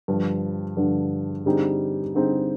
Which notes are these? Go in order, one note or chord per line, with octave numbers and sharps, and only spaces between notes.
G2 D3 F3
G2 D3 F3
D3 G3 C4 D#4 G#4
D3 G3 C4 D#4 G#4